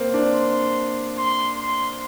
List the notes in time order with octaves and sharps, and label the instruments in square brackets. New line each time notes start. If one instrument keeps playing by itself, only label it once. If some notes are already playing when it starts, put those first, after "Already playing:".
Already playing: [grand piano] A#3 C4
D4
[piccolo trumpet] C6
C6
C6